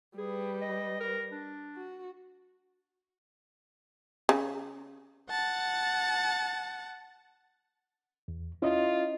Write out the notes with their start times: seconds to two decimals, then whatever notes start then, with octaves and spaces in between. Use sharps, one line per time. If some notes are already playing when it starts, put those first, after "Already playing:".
0.18 G3 G#4 B4
0.61 D#5
1.00 A#4
1.32 D4
1.76 F#4
4.29 C#3
5.31 F#5 A5
8.28 E2
8.62 C#4 E4 F4 D#5